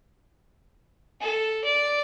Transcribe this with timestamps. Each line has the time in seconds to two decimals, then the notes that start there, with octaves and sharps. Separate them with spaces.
1.20 A4
1.64 D5